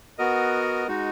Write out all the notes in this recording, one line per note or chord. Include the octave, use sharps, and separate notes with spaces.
B3 F#4 A#4 D#5
G#3 D#4 F#4